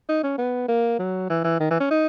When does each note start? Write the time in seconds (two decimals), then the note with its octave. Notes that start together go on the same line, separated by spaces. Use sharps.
0.09 D#4
0.23 C#4
0.38 B3
0.68 A#3
0.99 F#3
1.30 E3
1.44 E3
1.60 D#3
1.71 E3
1.80 C#4
1.91 D#4